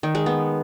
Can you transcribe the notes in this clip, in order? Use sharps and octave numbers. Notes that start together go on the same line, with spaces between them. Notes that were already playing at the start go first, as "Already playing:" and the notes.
D#3
G#3
B3